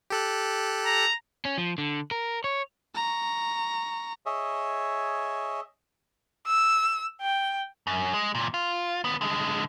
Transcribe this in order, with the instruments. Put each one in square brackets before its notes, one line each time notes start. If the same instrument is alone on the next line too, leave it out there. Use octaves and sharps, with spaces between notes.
[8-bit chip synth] G4 A4 F#6
[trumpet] A#5
[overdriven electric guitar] C#4
F3
D3
A#4
C#5
[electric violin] A#5 C#6
[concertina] G#4 C#5 D#5 E5
[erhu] E6
G5
[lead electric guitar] F#2
G#3
E2 A#2
F4
D#2 B3
D3 G#3